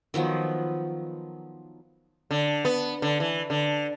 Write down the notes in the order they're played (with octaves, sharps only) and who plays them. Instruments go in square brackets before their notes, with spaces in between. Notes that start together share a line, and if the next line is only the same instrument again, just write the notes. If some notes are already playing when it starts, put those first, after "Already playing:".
[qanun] D#3 F3 F#3 B3
[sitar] D3
B3
D3
E3
D3